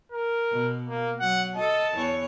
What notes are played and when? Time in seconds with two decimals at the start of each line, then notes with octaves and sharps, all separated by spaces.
0.12 A#4
0.51 B2
0.88 A#3
1.20 F#3 F#5
1.56 A4 D#5 A5
1.95 E2 E3 C#5